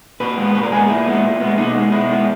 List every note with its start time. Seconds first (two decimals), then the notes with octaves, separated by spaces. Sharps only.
0.20 A#2 B4
0.38 G#3 B3
0.54 A#2 B4
0.63 A#4
0.72 G#3 B3 G#4
0.89 A#2 E4
1.06 G#3 B3
1.24 A#2
1.40 G#3 B3
1.58 B2 D#4
1.75 G#3 B3
1.92 B2 E4
2.09 G#3 B3